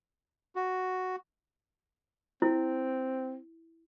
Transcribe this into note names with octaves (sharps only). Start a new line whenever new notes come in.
F#4
C4 E4